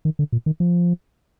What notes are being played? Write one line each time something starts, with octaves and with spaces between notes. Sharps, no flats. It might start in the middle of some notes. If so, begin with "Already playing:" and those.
D#3
D3
A#2
D#3
F3